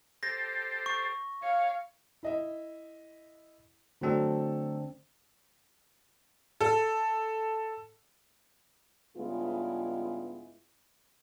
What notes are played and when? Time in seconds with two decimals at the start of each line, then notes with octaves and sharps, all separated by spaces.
0.23 G4 A4 C5 A#6
0.86 C#6
1.43 C#5 F5
2.23 E4 D#5 E5
4.01 D3 F#3 A3 C4 D4 A4
6.61 A4
9.17 G2 C#3 G#3 B3 E4 F4